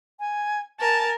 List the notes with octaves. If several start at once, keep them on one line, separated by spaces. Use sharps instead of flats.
G#5
A#4 G#5 A5